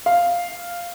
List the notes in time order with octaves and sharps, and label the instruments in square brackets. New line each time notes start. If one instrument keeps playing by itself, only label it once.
[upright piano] F5